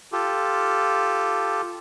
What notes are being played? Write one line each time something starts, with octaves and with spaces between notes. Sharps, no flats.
F4 G4 A4